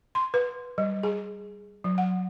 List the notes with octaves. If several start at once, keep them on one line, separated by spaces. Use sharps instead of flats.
C6
B4
G3
G#4
F#3
F#5